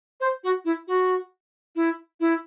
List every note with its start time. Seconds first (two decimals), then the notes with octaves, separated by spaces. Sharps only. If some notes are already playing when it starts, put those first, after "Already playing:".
0.20 C5
0.44 F#4
0.65 E4
0.88 F#4
1.76 E4
2.20 E4